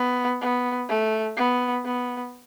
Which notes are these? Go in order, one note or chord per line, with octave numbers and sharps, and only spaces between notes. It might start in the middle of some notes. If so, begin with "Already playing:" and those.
Already playing: B3
B3
A3
B3
B3